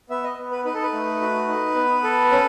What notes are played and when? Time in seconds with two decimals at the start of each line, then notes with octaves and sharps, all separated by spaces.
0.10 B3 E5
0.24 D#5
0.38 B3
0.51 B4
0.65 D#4 B4
0.74 A4
0.83 B4
0.93 A3
1.21 F#4
1.48 D#4
1.75 B3
2.03 A4
2.31 C#4